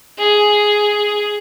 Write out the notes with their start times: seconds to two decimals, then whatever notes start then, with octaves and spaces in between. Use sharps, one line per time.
0.19 G#4